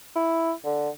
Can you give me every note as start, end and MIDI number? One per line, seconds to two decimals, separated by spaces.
0.15 0.52 64
0.65 0.89 50